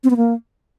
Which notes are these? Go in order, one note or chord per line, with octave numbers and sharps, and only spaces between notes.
C4
B3
A#3